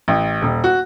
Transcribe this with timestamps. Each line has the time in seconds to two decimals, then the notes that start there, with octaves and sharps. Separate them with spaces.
0.08 A1
0.42 D#1
0.64 F#4